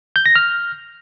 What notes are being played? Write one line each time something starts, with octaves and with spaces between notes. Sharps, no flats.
G6
A#6
F6